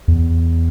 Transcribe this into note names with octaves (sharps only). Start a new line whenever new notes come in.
E2